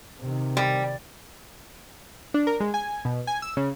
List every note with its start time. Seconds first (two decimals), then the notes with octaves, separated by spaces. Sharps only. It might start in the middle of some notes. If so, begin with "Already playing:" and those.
0.21 C3 D#3
0.57 G3
2.34 D4
2.47 A#4
2.60 G#3
2.74 G#5
3.05 B2
3.27 G#5
3.42 E6
3.57 C#3